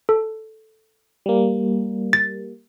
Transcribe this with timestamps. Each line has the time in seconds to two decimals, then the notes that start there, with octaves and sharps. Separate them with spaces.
0.09 A4
1.26 G3 A#3
2.13 A6